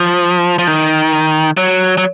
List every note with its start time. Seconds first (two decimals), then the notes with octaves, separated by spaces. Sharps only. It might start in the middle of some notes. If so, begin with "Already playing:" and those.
Already playing: F3
0.58 F3
0.67 D#3
1.57 F#3
1.97 F#3